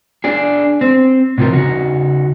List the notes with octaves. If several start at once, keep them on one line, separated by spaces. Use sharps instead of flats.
D4 G#4
C4
A2 C3 E3 F3 A#4
C#3 D#4 F#4